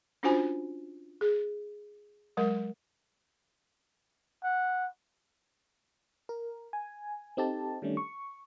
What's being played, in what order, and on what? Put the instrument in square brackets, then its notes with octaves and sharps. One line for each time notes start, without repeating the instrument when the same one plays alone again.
[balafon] C#4 D4 F4 F#4 C5 G#5
G#4
F#3 G#3 A#4
[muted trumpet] F#5
[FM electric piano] A#4
G#5
C4 D#4 G4 A4 A5
D#3 G3 A3 C#4 D4
C#6